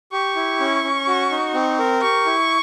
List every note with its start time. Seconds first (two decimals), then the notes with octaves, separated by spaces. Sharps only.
0.12 G4 C#6
0.36 E4
0.60 C#4
0.84 C#4
1.07 F#4
1.31 D#4
1.54 C4
1.79 A#4
2.02 G4 C#6
2.26 E4